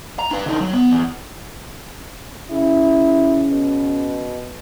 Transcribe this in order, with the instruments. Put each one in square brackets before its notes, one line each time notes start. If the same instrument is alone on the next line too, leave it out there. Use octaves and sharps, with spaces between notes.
[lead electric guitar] A#5
D4 B4
D3 D#4
F#3
B3
E2
[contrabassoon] C#3 [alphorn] E4
[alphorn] B2